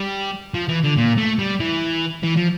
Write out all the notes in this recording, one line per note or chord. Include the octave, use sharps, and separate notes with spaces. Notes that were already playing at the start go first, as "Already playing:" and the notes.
Already playing: G3
F3
E3
D3
A#2
A3
G3
E3
E3
F3